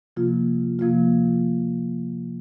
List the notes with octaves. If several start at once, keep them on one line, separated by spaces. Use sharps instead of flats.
C3 F3 A#3 F4
C3 F3 A#3 F4